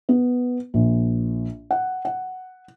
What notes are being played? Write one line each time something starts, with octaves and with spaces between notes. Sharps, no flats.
B3
A#1
F#5
F#5